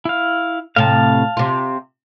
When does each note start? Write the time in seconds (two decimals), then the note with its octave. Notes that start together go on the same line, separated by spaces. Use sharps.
0.05 E4 F5
0.76 A2 C3 F5 A5
1.37 C3 F4